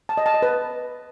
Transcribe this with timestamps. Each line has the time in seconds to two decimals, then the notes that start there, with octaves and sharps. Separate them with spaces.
0.09 A5
0.17 D#5
0.26 A5
0.34 D#5
0.42 B4